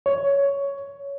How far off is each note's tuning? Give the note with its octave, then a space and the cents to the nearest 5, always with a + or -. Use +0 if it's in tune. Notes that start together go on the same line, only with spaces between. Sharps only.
C#5 +10